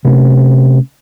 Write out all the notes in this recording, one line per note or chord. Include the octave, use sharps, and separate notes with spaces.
C3 A3 C#4